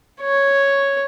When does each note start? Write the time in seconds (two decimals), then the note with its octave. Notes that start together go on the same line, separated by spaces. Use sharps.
0.21 C#5